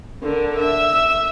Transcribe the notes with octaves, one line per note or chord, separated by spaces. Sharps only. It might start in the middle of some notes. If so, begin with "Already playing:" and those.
D3 A#4
E5